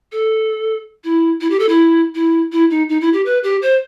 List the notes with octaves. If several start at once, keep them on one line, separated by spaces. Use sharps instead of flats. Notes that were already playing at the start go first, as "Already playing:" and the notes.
A4
E4
E4
G4
A4
E4
E4
E4
D#4
D#4
E4
G4
B4
G4
C5